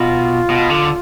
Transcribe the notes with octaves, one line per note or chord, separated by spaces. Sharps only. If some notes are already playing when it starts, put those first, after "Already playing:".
Already playing: B2 F4
B2
D3